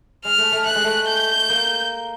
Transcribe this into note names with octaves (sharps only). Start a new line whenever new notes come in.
G#3 F6
A3
A3
A3 F#6
G#3
A3
G6
A#3